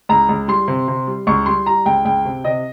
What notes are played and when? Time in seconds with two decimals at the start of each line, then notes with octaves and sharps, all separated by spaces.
0.09 C#2 A#5
0.29 C#2
0.48 G3 C6
0.68 C3
0.88 C3
1.07 G3
1.27 C#2 C#6
1.46 G3 C6
1.66 G3 A#5
1.86 C#2 G5
2.05 C#2 G5
2.25 C3
2.44 C3 D#5